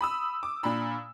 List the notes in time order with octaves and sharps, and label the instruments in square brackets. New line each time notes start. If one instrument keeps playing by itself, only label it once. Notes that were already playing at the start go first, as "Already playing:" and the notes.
[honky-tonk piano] B5 D#6 E6
D6
A#2 D4 B5 E6